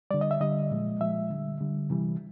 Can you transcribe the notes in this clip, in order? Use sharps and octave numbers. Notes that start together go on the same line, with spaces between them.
D3 G3 D5
D#5
E5
D3 G3 D#5
A#2 F3 G#3
A#2 F3 G#3 E5
D3 G3
D3 G3
C3 E3 G3